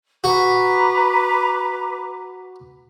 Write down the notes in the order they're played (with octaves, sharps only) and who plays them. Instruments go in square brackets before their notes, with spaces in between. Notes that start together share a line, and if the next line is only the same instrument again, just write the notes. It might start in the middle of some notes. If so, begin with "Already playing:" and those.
[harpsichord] F#4 [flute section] B4 A#5 D6